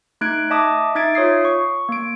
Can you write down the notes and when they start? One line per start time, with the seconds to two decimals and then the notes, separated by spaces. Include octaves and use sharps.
0.21 A3 D#4 F#6 G#6 D7
0.50 D#5 E5 A5 D6 D#6
0.95 D#4 E5 G#6 A6 D7
1.15 F4 C#5 D#6 C7
1.45 C#6
1.89 A#3 D7